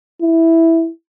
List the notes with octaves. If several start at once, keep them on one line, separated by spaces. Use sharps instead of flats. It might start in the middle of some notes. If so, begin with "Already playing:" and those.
E4